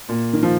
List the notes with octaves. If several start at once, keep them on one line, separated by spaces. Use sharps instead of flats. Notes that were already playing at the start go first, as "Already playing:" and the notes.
A#2
D#3
F3